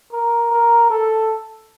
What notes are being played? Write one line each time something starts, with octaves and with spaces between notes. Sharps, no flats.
A#4
A#4
A4